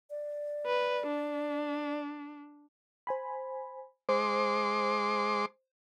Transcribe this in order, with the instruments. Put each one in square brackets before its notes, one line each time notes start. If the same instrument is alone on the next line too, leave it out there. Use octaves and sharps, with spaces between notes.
[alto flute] D5
[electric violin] B4
D4
[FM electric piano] C5 G#5 B5
[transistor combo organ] G#3 C6 D6 [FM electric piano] C5